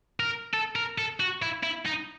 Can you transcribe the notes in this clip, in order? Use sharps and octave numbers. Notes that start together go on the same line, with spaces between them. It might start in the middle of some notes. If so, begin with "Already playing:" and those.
A#4
A4
A#4
A4
F#4
E4
E4
D#4